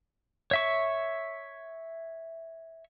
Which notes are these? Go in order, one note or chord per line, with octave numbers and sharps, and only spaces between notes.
C#5 E5 C#6